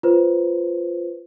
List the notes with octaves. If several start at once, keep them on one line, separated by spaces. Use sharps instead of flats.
F4 B4 C5